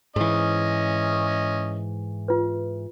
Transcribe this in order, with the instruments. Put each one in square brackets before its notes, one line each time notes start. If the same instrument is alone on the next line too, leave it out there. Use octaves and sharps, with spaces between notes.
[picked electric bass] G#2 E3 [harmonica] C#4 D#5
[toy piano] F4 B4